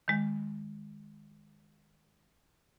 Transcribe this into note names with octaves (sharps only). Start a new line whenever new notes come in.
D#3 G#3